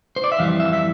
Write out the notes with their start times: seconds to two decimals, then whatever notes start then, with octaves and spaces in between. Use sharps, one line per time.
0.16 C5
0.24 D5
0.32 E5
0.39 F2 E3 G3 F5
0.60 E5
0.73 E5